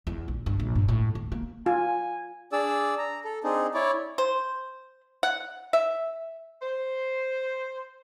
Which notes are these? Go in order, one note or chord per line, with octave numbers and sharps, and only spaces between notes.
E2
A#1
G2
A#1
G2
A2
D2
A#3
F4 G#5
D4 G#4 D5 E6
A#5
A4
C4 D4 D#4 G#4
E4 C#5 D5
C5
F#5
E5
C5